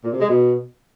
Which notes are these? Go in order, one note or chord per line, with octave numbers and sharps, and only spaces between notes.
A#2
C3
G#3
B2